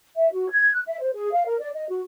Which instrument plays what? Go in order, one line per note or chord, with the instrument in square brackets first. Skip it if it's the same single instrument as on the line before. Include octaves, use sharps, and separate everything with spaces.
[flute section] E5
F#4
G#6
F#6
E5
C5
G#4
F5
A#4
D5
D#5
F#4